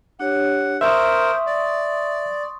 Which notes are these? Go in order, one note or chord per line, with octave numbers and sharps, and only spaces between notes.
D4 G4 C#5 F#5
A#4 C5 E5 C6 C#6 D#6
D5